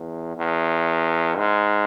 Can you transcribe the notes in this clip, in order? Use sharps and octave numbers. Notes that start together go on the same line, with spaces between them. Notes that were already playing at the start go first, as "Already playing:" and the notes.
Already playing: E2
E2
G#2